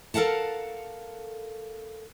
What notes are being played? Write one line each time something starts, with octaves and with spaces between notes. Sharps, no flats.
A4 A#4 F5 F#5 A5